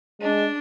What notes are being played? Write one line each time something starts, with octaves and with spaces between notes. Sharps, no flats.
G#3 D4